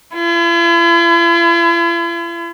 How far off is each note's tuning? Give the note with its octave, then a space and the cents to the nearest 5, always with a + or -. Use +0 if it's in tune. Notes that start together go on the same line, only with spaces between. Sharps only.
E4 +45